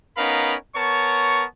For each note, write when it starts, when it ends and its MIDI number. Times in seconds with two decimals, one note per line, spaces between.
0.17 0.55 59
0.17 0.55 61
0.17 0.55 63
0.17 0.55 70
0.17 0.55 77
0.17 0.55 83
0.75 1.44 59
0.75 1.44 70
0.75 1.44 73
0.75 1.44 81
0.75 1.44 85